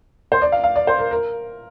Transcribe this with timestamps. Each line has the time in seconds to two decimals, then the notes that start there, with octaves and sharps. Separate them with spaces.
0.32 C5
0.42 D5
0.52 F5
0.64 F5
0.76 D5
0.87 C5
0.99 A#4
1.11 A#4